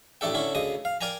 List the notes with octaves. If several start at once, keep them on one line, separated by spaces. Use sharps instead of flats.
A1 A2 A3 D4 A4 G5
D3 C#4 E4
D2 C#3 D#5 D#6
F5
A#4 D5 G5 G#5 A#5